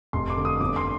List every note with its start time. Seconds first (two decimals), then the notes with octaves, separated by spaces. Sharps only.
0.13 F1 C6
0.30 D6
0.37 D3
0.45 D#6
0.60 G1 D6
0.76 C6